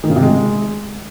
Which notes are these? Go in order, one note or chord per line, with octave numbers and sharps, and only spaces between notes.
D#3
C#3
C3
G#3